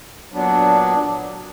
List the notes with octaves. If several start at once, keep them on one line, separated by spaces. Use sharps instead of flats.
A#2 F#3 B3 D4